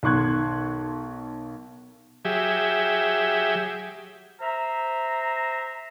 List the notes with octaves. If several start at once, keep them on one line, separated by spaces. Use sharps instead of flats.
B1 D#3 C6 C#6 F#6 G#6
F#3 G4 G#4 E5
C5 E5 A#5